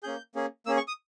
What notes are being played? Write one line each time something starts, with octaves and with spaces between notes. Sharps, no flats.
A#3 C#4 G#4 G6
A#3 C#4 G#4
A#3 C#4 G#4 E6
C#6
D#6